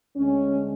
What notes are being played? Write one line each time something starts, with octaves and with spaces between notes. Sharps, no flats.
D2 D3 G#3 C#4